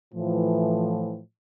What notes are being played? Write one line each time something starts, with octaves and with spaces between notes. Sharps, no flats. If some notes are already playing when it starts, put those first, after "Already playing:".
A2 E3 F3